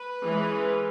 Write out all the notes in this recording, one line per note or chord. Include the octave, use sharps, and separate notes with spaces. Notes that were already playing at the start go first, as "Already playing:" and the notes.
Already playing: B4
E3 G#3 C#4